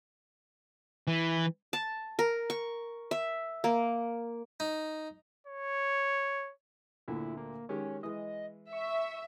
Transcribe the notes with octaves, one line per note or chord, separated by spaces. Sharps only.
E3
A5
A#4
C#6
E5
A#3
D#4
C#5
D2 A#2 D3 E4
A#3
D#3 G#3 C#4 G4
E3 G#3 D#5
E5 C#6